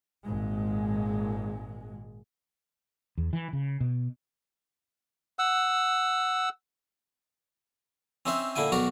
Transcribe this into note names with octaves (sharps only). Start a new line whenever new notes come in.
G#1 A#2 G#3
E2
E3
C#3
B2
F#5 E6
C4 C#4 D#4 C5 E5
A#2 D3 E4 G5 G#5
B1 D#3 F#4 A#4 D5 A#5